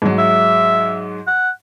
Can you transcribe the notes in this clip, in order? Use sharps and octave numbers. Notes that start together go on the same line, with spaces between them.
G#2 F#3
E5
F#5